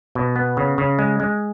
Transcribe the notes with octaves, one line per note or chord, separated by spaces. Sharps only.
B2
B3
C#3
C#3
G#3
G#3